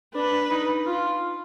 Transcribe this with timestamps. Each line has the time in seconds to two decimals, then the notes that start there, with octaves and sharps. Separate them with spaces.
0.15 D4 B4
0.50 D#4
0.86 F4